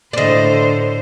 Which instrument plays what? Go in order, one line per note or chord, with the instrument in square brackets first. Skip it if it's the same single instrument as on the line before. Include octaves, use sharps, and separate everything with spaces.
[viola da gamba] A2 D3 C5 [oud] D5 D#5